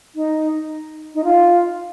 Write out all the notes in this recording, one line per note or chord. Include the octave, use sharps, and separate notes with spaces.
D#4
D#4
F4